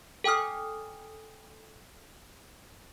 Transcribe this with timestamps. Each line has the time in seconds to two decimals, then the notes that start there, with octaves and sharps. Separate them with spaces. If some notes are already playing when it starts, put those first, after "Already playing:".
0.24 A4 G5 G#5 D#6 F6